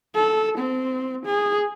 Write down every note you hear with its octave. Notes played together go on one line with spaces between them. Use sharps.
A4
C4
G#4